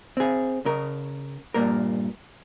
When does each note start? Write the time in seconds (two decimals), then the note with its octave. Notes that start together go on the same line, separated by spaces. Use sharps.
0.17 C4 G#4
0.65 C#3 A#4
1.54 G2 A#2 A#3 A#4